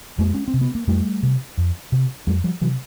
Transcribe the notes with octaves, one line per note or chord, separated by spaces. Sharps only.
F2 G#3 A#3
C#4
C4
C3
B3
A#3
F2 G3 A3
C3
F2
C3
F2 F#3 G#3
F3 G3
C3 E3 F#3